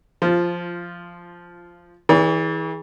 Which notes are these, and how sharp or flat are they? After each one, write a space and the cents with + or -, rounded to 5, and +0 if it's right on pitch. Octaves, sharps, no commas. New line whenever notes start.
F3 +0 F4 -15
E3 -35 G#4 +0 C#5 +45